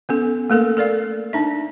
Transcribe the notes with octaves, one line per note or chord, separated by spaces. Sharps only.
B3 C#4 A4
A3 A#3 A4 A#4
A4 A#4 D5 F5
D4 D#4 E5